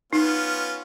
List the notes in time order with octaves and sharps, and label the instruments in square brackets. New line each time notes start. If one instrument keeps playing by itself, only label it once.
[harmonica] B3 C#4 F4 [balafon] D#4